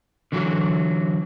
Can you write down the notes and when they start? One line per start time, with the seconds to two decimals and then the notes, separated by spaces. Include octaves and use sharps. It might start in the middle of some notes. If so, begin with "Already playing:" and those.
0.32 D3 E3 F#3 F#4